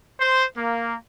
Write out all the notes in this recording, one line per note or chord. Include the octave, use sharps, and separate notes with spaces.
C5
A#3